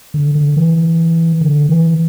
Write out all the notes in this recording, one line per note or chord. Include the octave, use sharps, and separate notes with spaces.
D3
D3
E3
D3
E3